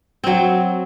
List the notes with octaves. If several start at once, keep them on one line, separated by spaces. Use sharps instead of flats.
F#3 C4